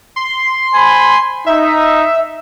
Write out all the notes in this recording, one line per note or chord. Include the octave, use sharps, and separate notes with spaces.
C6
C5 G#5 B5
D#4 E5